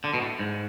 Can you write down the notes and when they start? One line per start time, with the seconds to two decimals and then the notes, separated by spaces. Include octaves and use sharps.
0.04 D3
0.14 B2
0.21 A2
0.39 G#2